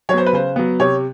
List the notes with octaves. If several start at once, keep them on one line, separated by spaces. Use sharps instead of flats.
F#3 B3 C5 C#5
B4
C#3 C5
F#3 B3
C3 C#5